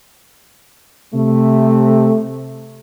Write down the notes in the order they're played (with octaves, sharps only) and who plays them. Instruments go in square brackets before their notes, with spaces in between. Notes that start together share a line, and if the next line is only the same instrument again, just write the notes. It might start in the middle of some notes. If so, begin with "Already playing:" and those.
[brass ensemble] C3 A3